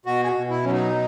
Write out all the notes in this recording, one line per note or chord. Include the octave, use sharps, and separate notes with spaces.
B2 F#4
G#4
F#4
B2
E4
F#3 C#4
D#4